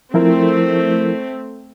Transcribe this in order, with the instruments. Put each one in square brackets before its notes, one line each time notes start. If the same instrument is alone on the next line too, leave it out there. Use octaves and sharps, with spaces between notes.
[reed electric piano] F3 E4 A#4 [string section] A3 C4